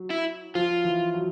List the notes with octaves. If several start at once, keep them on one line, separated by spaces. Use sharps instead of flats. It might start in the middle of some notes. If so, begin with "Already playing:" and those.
Already playing: F#3
E4
F3 F4
E3
F#3